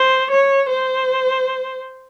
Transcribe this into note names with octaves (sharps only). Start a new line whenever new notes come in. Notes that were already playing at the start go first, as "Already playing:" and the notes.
Already playing: C5
C#5
C5